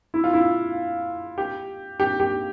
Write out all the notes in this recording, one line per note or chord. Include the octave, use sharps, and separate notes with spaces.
E4
F4
E4
G4
G4
G4